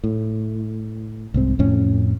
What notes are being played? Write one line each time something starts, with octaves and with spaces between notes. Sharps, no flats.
A2
C2 G#2 C4
F2 A2 C#4